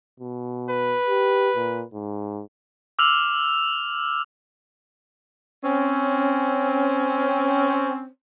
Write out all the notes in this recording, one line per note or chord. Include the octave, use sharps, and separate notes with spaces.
B2
B4
G4
A#2
G#2
D6 E6 F6 F7 F#7
C4 C#4